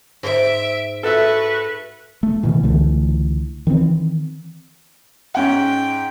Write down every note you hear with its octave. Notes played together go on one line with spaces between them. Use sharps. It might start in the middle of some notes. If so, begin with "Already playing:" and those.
G#2 C5 E5 D7
F#4 A4 B4 E5 C#6
A3
B2 D#3 E3
C#2 D3 E3 A3
D#3 E3 G#3 C4
G#2 C#4 F#5 G5